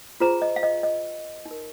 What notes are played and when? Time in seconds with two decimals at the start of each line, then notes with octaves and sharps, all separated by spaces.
0.20 F4 G#4 C5 A#5
0.42 D#5
0.56 F5
0.63 D#5
0.83 D#5
1.46 D#4
1.51 A#4